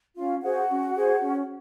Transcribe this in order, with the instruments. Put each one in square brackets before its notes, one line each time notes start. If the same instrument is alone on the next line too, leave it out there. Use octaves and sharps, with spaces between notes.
[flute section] C#4 F4 F5
F#4 G#4 C5 F#5
C#4
G#4 C5
C#4